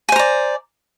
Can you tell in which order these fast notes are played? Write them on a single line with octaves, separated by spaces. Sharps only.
G#5 C5 A#5 D5